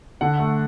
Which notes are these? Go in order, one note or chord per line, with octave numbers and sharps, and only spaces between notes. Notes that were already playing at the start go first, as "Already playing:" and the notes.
D3 F#5
A3